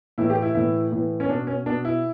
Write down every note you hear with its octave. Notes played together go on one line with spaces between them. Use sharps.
A2 E3 E4
G4
E4
A2 E3 E4
A2 E3
C#4
B2 D4
C#4
B2 D4
E4